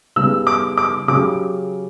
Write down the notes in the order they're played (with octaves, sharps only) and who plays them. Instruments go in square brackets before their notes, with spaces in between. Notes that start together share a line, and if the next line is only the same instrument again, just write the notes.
[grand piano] C#3 G3 B3 [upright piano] E6
[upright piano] D6
D6
[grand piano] C#3 F#3 C#4 G4 [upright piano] D6